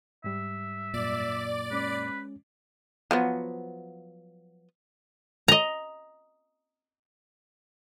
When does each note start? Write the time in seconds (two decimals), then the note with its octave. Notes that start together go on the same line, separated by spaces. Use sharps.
0.24 G#2 G3 E5
0.94 F#2 A#2 D5
1.71 G#3 C#4 B4
3.11 F3 F#3 B3
5.48 D#5 A#5